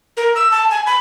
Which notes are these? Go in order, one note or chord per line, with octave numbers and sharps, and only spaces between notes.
A#4
E6
A5
G#5
B5